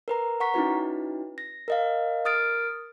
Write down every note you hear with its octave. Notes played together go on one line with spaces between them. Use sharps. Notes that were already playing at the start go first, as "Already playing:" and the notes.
A#4 B4 A#5
F#5 A#5 C#6 B6
C#4 D#4 E4 F#4 B4
A#6
A#4 D#5 F5
A#4 D#6 F6 A6 D7